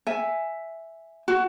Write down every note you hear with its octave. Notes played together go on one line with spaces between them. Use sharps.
E5 G#5
F#4